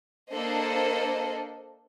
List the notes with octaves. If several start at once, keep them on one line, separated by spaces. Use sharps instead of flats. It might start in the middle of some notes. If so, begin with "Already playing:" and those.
A#3 D4 A4 C5 D#5